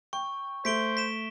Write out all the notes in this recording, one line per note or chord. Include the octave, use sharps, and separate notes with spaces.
G5 C#6
A3 C5 B6 D7 G7
B6 E7